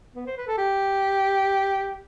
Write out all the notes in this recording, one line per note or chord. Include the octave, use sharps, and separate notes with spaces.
B3
C5
B4
A4
G4